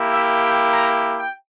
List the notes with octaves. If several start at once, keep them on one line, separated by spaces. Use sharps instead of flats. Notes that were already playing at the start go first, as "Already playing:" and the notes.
Already playing: A#3 E4 G4
E5
G5
A#5
G5